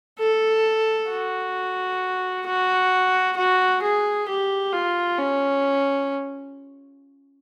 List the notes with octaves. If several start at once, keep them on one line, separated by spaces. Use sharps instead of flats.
A4
F#4
F#4
F#4
G#4
G4
F4
C#4